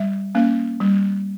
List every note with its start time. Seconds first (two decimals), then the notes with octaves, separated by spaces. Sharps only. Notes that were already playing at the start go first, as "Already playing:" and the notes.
Already playing: G3 E5
0.35 A#3 C#4
0.80 G3